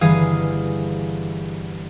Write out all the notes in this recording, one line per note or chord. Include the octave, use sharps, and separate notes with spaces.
G1 E3 G#4 F5 D#6